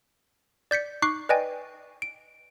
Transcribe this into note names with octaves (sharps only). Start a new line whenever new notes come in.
D5 G6 B6 C#7
D#4 C#6 D6 F#6 C7
B4 D5 D#5 G5 G#5
D7